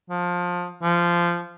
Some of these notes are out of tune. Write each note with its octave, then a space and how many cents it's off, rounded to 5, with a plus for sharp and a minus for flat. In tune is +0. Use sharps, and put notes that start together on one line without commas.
F3 +20
F3 -15